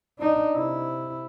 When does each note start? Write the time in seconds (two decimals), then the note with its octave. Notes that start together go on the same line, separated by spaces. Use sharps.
0.19 D4 D#4
0.55 C3 E4